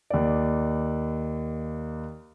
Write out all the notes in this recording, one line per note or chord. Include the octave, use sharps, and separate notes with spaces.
D#2 D5